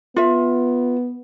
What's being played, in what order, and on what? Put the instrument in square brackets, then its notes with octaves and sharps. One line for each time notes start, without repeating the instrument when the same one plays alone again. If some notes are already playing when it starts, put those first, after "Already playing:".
[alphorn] B3 [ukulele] F4 E5